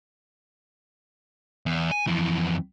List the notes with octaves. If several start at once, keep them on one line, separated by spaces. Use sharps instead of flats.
E2
G#5
F2 E3